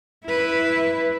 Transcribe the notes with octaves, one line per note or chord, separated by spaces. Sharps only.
E4 B4